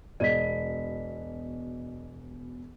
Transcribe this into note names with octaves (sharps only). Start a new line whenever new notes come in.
E1 B2 D5 D#5 B6 D#7